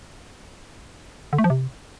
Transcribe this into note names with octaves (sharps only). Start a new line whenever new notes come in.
D3
A3
F3
C3